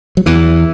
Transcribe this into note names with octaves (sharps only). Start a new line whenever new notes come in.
F#3
E2 E3